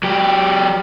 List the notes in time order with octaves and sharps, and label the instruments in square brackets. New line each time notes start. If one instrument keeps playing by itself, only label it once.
[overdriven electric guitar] F#3 G4